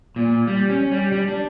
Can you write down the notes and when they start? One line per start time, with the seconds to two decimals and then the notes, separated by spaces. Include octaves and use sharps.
0.16 A#2
0.47 G3
0.69 C#4
0.91 G3
1.12 G3
1.28 D4